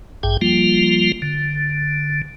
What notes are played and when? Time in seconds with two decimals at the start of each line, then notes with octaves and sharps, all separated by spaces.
0.23 A1 G2 G#4 G5
0.41 F3 G3 A#3 F4
1.22 D3